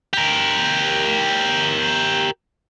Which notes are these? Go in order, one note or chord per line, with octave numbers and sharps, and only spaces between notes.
G4 A#4